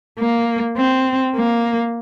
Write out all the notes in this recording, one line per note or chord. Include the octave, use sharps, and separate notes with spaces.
A#3
C4
A#3